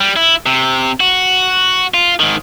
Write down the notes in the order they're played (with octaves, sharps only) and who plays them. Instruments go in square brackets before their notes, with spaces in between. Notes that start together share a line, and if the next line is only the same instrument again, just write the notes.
[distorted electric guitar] G3
E4
C3
F#4
F4
G#2 D#3